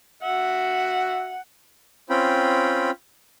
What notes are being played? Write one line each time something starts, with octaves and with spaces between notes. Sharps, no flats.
F#4 E5 F#5
C4 C#4 F4 G5 B5